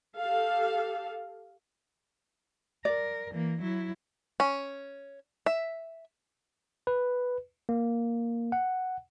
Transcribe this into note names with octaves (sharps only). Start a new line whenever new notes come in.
G4 A4 F5
A#4 D5
E3 A#3
F#3 E4
C#4
E5
B4
A#3
F#5